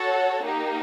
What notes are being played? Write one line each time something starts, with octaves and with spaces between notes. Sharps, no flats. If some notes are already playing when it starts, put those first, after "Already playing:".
Already playing: F#4 A4 C#5 F#5
A#3 D#4 G4